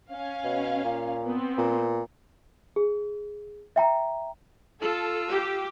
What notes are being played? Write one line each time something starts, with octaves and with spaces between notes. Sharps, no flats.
C#4 F5
B2
A#2
B3 C4
A#2
G#4
E5 G5 A#5
F4 A4 E6
G4